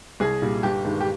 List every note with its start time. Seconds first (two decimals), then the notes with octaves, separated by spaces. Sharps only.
0.20 C2 G#4
0.42 A#2 G3
0.63 G1 G4
0.85 G2 D#3 G#3
1.01 G4